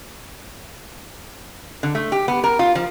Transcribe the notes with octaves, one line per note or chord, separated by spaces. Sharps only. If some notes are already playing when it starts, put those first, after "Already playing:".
D3
A3
G4
B3
A#4
F4
F3